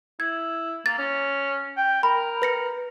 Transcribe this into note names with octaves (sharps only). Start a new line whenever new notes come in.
E4 G#6
A#3 A6
C#4
G5
A#4 B5
B4 A#6 C#7